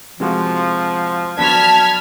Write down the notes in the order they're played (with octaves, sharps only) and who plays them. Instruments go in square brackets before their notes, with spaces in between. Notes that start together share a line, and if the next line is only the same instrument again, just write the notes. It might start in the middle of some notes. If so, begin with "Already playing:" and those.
[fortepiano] C3 G#3 F#4 [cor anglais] F3
[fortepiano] F#3 B3 D4 [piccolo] A5 [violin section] F6 G#6 B6